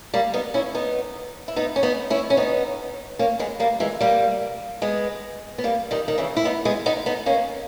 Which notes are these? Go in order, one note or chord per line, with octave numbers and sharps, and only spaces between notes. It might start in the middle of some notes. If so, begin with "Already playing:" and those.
G3 A#3
B3 D#4
C#4 E4
B3 D#4
E4
B3 D#4
C#4
B3 D#4
C#4 E4
C#4
B3 D#4
A#3 C#4
G#3 B3
G3 A#3
E3 G#3
G3 A#3
G#3 B3
B3
G3 A#3
D#3 G3
D#3
C#3 E3
E4
B3 D#4
G#3 B3
B3 D#4
B3 D#4
A#3 C#4